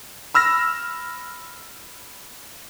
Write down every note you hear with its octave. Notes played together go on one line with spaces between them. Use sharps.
B5 E6 F6 A#6